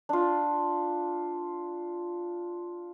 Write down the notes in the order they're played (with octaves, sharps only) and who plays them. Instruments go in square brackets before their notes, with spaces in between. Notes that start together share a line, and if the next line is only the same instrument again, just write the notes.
[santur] D4 F4